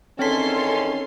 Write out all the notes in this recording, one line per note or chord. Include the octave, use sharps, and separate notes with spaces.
E2 D#3 C4 C#4 A4 C#5 C6 B6